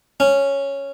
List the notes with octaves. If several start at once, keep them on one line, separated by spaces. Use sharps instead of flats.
C#4